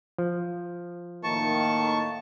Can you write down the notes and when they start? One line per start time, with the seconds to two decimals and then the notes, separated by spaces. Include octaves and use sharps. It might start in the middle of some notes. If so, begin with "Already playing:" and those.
0.18 F3
1.24 A2 D#3 A#3 A5 C#6